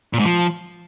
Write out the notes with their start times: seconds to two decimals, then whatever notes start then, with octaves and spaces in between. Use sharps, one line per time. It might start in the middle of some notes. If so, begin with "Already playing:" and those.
0.13 A#2
0.19 G#2
0.25 F3